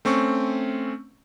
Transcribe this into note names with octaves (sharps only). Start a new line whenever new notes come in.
A3 C4 C#4 C#6